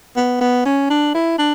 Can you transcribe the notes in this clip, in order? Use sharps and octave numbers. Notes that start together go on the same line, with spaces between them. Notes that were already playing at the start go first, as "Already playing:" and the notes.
B3
B3
C#4
D4
E4
D4